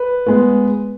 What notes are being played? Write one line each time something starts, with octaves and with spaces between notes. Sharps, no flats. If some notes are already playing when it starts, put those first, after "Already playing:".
Already playing: B4
G#3 B3